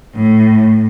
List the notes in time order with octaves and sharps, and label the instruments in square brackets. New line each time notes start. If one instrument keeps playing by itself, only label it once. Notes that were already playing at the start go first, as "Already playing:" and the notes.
[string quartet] A2